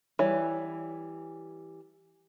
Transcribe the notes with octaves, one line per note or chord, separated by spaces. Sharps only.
E3 G3 C#5